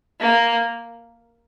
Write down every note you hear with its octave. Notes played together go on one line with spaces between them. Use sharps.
A#3